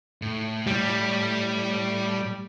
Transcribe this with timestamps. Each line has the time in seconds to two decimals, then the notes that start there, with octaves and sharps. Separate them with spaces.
0.22 A2
0.67 G3